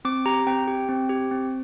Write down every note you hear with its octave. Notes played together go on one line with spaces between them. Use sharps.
C4 D6
G4 A#5
C4 G5
G4
C4
G4
C4